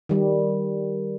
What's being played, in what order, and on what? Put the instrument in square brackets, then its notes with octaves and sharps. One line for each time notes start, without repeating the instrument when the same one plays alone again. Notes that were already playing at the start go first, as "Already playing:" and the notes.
[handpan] D#3 G3